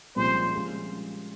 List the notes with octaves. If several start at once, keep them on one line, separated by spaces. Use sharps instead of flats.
C2 A#2 F3 G#3 C#4 C5
C#3 F3 G#3 C#4 F4